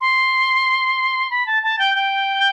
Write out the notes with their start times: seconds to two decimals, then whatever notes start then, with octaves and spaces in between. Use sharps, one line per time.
0.01 C6
1.30 B5
1.46 A5
1.63 A5
1.79 G5
1.95 G5